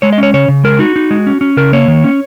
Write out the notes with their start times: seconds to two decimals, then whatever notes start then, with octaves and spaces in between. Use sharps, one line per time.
0.02 G#3 C#5
0.13 D#5
0.18 C#4 C#5
0.34 C#3 C#5
0.48 C#3
0.64 G#3 A#4
0.79 D#4 F#4
0.96 D#4
1.11 G#3
1.27 C#4
1.41 C#4
1.57 C#3 A#4
1.73 A#3 C#5
1.88 D#3
2.04 C#4